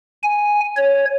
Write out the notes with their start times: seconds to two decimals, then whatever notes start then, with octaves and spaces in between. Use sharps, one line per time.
0.23 G#5
0.77 C#5